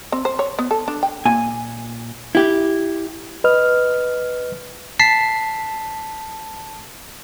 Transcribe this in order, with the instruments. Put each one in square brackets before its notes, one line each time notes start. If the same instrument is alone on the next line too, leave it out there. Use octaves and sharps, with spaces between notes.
[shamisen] C4
C5
C#5
B3
A4
D4
G5
[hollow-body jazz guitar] A#2 G#5
E4 G4
[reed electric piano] B4 D#5 F6
[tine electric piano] A5 B6 C7